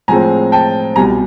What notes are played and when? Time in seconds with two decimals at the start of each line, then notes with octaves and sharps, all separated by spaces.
0.08 A2 F3 G#3 C4 G#5 A#5
0.52 G5 A5
0.96 C2 B2 G3 G#5 A#5